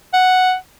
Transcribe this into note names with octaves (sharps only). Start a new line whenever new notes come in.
F#5